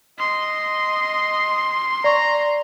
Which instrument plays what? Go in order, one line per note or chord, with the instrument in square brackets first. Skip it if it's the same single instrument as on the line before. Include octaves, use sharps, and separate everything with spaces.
[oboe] D#5 [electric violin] C6
[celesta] D5 C#6 [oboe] A#5